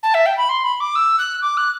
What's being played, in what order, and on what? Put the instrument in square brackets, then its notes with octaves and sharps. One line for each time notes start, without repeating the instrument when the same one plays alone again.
[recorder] A5
E5
G5
B5
C6
B5
D6
E6
F#6
D6
F#6